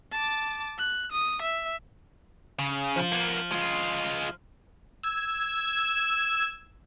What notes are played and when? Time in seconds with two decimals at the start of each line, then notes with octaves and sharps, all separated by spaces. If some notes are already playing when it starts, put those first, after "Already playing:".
0.12 A5 D6
0.79 F#6
1.12 D#6
1.42 E5
2.59 C#3
2.96 F3
3.12 A#3 B3
3.52 G#3 F4
5.03 E6 G#6